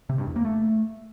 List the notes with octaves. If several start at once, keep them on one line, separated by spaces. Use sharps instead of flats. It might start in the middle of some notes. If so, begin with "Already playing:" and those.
C3
G2
E2
A#3
A3